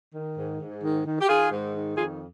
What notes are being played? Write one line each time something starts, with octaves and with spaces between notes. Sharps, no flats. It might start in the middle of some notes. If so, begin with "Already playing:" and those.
D#3
G#2
G#2
D#3
D#3
G4
D#3 F4 G#4
G#2
D#3
F2 F4 G#4